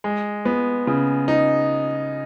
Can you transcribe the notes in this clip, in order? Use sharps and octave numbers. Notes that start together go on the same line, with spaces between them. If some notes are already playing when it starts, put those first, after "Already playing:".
G#3
B3
C#3
D#4